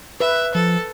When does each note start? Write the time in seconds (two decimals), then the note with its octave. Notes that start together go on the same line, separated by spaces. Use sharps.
0.20 B4 E5
0.55 F3 A4